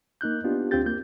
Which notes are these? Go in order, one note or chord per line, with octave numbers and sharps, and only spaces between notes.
A#3 D#4 F#6 G6
B3 D4 F4 G4
D2 C4 F4 G4 G6 A6
A#3 G6